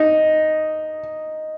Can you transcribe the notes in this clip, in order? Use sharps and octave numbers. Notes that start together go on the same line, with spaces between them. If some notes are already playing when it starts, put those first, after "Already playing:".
Already playing: D#4